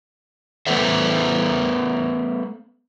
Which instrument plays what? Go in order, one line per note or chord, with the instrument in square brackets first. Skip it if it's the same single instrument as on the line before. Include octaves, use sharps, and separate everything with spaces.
[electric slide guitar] A3 B3 A4 B4 C5 E5